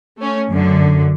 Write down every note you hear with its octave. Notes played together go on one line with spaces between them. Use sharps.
A3 C#4
F#2 D3